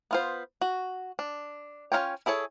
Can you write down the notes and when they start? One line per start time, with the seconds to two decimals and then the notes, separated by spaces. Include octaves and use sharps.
0.11 B3 F4 C5
0.61 F#4
1.19 D4
1.92 C#4 E4 F4 C#5 G5
2.26 E4 G#4 A4 C#5